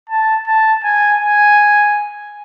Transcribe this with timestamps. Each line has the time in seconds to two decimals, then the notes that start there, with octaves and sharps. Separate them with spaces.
0.09 A5
0.47 A5
0.84 G#5
1.22 G#5